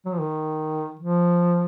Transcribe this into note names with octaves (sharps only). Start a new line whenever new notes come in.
F#3
F3
D#3
F3